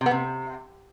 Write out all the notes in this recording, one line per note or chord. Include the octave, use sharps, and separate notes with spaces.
C3
B3
C3